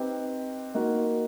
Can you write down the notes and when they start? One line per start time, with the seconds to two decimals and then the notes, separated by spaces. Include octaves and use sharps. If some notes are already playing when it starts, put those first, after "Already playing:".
Already playing: C4 D#4 G4 B4
0.74 A#3 D#4 F#4